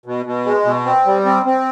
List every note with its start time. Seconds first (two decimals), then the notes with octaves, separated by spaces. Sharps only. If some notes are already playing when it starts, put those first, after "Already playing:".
0.06 B2
0.26 B2
0.45 G#3
0.65 B2
0.86 C4
1.06 G3
1.25 C4
1.46 C4